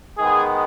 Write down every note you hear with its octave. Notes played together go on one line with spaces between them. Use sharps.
D#3 G#3 B3 G#4